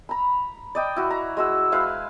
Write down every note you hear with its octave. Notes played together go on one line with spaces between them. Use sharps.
A#5 B5
D5 D#5 G5
E4 F#4
A#5
G#3 F#4 E6
G#3 E4 B4 F5